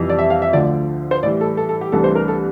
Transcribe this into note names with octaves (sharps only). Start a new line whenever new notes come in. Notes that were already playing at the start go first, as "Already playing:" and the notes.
Already playing: F2 C3 E3 G3
D5
E5
F5
E5
D2 D3 F3 D5
C5
A2 E3 G3 D5
A4
A4
A4
G4
C2 C3 E3 A3 D4 A4
C5
A#4
A4